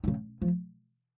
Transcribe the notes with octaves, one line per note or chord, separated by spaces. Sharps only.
D#3
C#3
F3